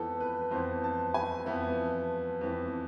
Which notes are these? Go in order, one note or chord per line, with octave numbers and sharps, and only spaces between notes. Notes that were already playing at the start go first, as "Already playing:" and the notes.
Already playing: F2 E3 B3 A4
B4
F2 E3 B3 C5
A5
G#5
F2 E3 B3 E5
F2 E3 B3